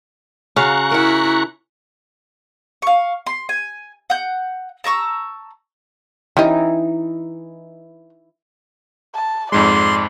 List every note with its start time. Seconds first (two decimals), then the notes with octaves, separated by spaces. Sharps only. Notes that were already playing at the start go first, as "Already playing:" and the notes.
0.56 C#3 F#4 F5 A#5 C#6 F#6
0.91 E4 A#4 F#5
2.82 F5 C#6
3.26 C6
3.49 G#5
4.10 F#5 G6
4.84 A5 A#5 C#6 E6
6.37 E3 C#4 D#4 G4 D#5
9.14 A5
9.52 F2 G#2 G#3 D5 C6